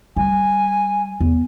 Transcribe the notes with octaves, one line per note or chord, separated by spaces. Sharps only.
G3 G#5
E2